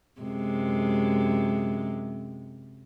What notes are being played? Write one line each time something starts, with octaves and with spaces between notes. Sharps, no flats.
F#2 C3 G#3